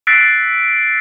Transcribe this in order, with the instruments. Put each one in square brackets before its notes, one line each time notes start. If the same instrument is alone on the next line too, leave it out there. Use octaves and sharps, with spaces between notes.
[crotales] E6 F#6 A6 B6 C7 D7